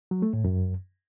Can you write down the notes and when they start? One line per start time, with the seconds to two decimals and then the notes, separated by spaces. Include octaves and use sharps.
0.11 F#3
0.22 A3
0.33 A2
0.44 F#2